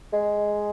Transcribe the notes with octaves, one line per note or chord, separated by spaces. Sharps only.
G#3